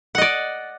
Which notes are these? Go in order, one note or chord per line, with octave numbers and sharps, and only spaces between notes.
D5 D#5 F#5